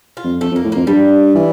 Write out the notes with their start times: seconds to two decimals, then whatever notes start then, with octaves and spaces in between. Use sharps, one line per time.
0.17 F4
0.24 F2
0.41 F2 A3
0.52 F2 A#3
0.65 A2
0.72 F2 A#3
0.87 G2 G3
1.35 E3